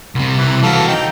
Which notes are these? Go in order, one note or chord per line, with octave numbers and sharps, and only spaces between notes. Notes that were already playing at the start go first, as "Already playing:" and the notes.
C2 C3
E3
E3 F#4 A4 F5
D#4 G5